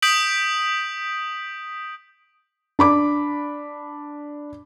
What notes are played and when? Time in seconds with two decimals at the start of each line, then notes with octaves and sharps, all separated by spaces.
0.02 D#6 G6 B6 D7 F#7
2.79 D4 B5 D6